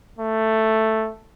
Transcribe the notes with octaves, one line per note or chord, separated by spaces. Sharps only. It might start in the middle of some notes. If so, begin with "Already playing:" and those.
A3